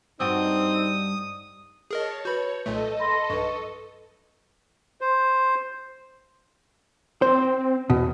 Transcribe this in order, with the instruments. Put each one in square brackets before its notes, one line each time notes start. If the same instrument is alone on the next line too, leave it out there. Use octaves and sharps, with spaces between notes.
[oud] G2 F#4 [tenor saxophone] C4 [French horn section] D#4 [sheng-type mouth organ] D#6
[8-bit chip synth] G#4 A#4 D#5 [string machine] C#5 A5
[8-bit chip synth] F#4 B5 [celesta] B4 G6 [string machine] C#5
[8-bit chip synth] B1 A#2 A3 [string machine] A4 D#5
[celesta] B5 C6 A#6
[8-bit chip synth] B1 G2 [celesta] B4 C#6
[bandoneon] C5
[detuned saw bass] C4 [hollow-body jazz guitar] C5
[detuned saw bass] E2 [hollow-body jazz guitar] B2